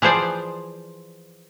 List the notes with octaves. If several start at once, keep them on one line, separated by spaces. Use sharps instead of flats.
E3 F3 G#4 C5 D5